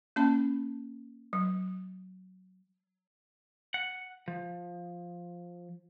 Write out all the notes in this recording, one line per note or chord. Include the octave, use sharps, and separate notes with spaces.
A#3 C#4 A5
F#3
F#5
F3